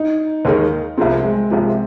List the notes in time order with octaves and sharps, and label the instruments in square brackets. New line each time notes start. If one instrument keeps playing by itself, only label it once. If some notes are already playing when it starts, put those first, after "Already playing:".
Already playing: [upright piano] D#4
[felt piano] D#2 D#3 G#3 D#4 A#4
[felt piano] C2 C3 F3 G#3 [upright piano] C4
[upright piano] G#3
[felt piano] C2 C3 F3 G#3